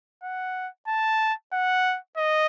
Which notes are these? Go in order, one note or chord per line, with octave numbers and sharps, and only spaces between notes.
F#5
A5
F#5
D#5